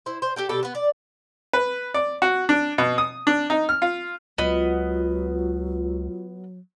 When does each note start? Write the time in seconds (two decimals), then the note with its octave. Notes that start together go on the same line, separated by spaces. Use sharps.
0.06 E4 C5
0.22 C5
0.36 G4 A4 G5
0.49 B2 G3 G4 A4
0.63 B3 B4
0.75 D5
1.53 B4
1.94 D5
2.22 F#4
2.49 D4
2.78 B2
2.98 D#6
3.27 D4
3.50 D#4
3.69 F6
3.82 F4
4.38 C#2 F#3 B3 F4 D#5